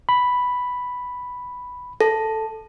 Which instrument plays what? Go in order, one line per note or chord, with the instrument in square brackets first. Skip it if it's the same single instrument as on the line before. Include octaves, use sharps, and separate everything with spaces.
[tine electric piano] B5
[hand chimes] A4